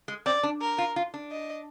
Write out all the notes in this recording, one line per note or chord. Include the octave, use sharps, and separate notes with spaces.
G#3
C4 D5
D4
A#4
F4
F4
D4
D#5